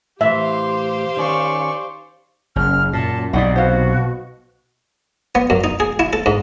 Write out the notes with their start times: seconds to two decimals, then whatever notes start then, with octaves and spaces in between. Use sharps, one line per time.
0.21 A2 E3 G4 C5 E5 F5
1.17 D#3 C#4 D5 C#6
2.56 F#1 C#3 F6
2.93 F#2 A#2 A5
3.33 B1 C3 D#4 D5 F#5
3.56 B2 F#4 C5 F5
5.35 B3
5.50 F#2
5.64 D#4
5.80 G#4
5.99 E4
6.13 A4
6.26 G#2